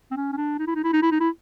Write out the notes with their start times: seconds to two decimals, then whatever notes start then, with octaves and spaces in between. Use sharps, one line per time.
0.11 C4
0.16 C#4
0.33 C#4
0.37 D4
0.59 D#4
0.67 E4
0.75 D#4
0.84 E4
0.93 D#4
1.02 E4
1.11 D#4
1.20 E4